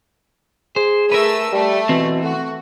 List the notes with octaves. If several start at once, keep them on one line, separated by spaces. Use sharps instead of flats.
G#4 C5
A3 A#4 B4 E6
G3 A3
B2 E3 C4
A3 F#4